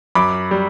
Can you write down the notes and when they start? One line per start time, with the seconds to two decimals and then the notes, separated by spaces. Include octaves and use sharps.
0.15 F#2 B5 D6
0.51 G3